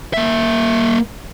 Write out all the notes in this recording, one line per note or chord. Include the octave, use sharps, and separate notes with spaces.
A#3 E5